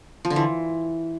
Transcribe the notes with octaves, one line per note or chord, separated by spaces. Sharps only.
F3
D3
E3